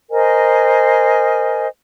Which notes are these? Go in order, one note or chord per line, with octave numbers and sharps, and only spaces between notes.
A#4 C5 D#5 G#5